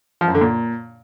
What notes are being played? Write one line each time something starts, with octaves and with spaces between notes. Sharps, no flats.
F3
F#2
D3
A#2